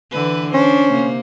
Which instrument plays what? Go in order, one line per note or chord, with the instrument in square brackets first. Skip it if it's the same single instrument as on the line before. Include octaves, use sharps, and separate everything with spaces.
[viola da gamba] D3 E3 B4
[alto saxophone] C#4 [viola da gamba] D4 C5
[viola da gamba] C3 A#3